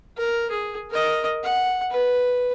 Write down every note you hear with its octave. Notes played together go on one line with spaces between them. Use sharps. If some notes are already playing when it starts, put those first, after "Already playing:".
A#4
G#4
A#4 D#5
F#5
B4